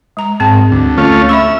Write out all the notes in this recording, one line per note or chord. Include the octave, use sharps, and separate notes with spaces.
G#3 A#5
G#2 C4 A5
D2
A3 C#4 F4
E5 B5 C#6 E6